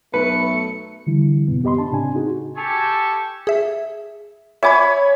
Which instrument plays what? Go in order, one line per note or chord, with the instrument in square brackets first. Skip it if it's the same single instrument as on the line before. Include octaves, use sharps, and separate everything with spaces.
[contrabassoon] B1 [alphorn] A3 [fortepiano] B4 [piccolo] C#7
[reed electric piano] D3 E3 G3 E4
F#2 A2 C3 B3
B3 G4 D#5 B5 C6
D4 A5
A2 C#3 C4 D4 G#5
D#4 F#4 G#4
[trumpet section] G4 A4 G#5 A5 C#6
[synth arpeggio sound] G#4 E5
[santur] C#5 G#5 B5 [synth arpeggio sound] E5 D6 G#6